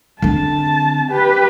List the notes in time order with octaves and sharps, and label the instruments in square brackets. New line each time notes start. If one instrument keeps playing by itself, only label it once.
[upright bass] D3 C4 [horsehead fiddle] A5
[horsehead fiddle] G4 B4